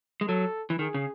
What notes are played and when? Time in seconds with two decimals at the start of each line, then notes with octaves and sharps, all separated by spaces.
0.21 G#3
0.28 F#3 A4
0.70 E3
0.79 D#3 G#4
0.94 C#3